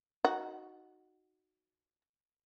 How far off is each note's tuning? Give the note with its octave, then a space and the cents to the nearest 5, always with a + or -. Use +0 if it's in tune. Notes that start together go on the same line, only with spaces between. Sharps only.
D#4 +0 F#4 +0 F#5 +20